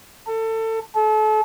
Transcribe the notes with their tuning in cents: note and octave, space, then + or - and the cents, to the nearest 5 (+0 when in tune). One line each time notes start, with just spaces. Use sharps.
A4 +25
A4 -35